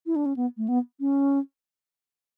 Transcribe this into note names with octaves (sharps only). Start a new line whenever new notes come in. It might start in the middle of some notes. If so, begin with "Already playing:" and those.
E4
D4
C#4
B3
A3
B3
C#4